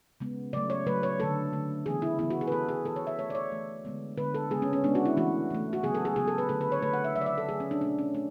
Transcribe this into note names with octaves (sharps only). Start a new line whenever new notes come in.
C#3 G#3 B3
C#3 F#3 A3 D5
C#5
C#3 F#3 A3 B4
C#5
D3 A3 A4
D3 A3
C#3 E3 B3 G#4
E4
C#3 E3 B3 E4
F#4
G#4
B4
E3 B3 A4
G#4
E3 B3 A4
C#5
E5
E3 A3 C#5
D5
C#5
E3 A3
D3 G#3 B3
D3 G#3 B3 B4
A4
C#3 G#3 B3 G#4
C#4
C#4
C#3 G#3 B3 D4
F#4
E4
E3 A3 F#4
E3 A3
F#4
C#3 F#3 B3 G#4
A4
G#4
C#3 F#3 B3 G#4
A4
B4
D3 A3 A4
B4
C#5
D3 A3 B4
F#5
E5
C#3 F#3 A3 E5
D5
E5
A4
C#3 F#3 A3 G#4
C#4
D4
B2 A3 D4
C#4
A3 D4